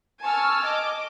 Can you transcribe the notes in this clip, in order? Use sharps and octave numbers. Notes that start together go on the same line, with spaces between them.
G#5 A5 C#6 E6 F6
D#5 D6